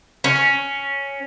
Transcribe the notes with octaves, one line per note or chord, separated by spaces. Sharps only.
C#4